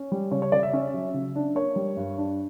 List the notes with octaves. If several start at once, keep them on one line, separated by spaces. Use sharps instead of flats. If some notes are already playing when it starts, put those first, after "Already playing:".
Already playing: C#4
G3
C#3 C#5
C#5
C#3 D5
E5
C#4 E5
F#3
C#3
D4
A#3 C#5
G3
G2
D4